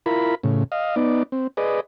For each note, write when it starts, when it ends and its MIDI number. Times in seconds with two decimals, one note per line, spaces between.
0.06 0.35 64
0.06 0.35 65
0.06 0.35 70
0.06 0.35 83
0.44 0.64 45
0.44 0.64 49
0.72 0.95 75
0.72 0.95 77
0.96 1.23 59
0.96 1.23 63
0.96 1.23 74
1.32 1.47 60
1.57 1.80 68
1.57 1.80 71
1.57 1.80 74
1.57 1.80 75